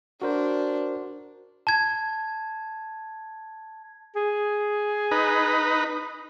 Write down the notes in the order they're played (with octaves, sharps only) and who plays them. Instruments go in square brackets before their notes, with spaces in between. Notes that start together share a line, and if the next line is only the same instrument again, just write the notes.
[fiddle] D4 [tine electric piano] F#4 A#4 C5
[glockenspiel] A5 G#6
[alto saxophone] G#4
[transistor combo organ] D#4 B4